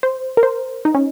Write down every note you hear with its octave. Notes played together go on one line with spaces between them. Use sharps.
C5
A#4
C5
D#4
C#4